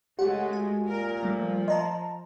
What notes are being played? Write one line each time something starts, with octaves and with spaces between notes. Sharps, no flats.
C#3 G#3 A3 G4 F#5
F#4 G#5
A#2 A#4
F3 G3 A3
D#5 A5 A#5 C6